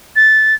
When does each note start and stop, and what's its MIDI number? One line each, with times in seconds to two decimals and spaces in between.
0.16 0.55 93